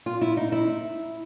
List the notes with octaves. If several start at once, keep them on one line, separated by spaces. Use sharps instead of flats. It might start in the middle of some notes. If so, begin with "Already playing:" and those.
F4
E4
D#4
E4